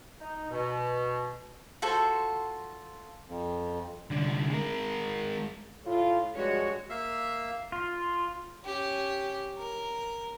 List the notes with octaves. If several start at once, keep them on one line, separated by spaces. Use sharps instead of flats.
D#4
B2
F4 F#4 A4 C5
F2
C2 D3
G#3 A#4
A2 F4
G2 F3 G#3 F#4 C#5
A#3 E5 F5 E6
F4
C#4 G4
A#4